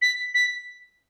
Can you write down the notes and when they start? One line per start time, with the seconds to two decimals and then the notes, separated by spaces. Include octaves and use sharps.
0.02 B6
0.34 B6